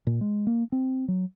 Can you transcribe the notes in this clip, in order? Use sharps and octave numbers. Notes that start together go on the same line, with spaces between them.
A#2
G#3
A#3
C4
F#3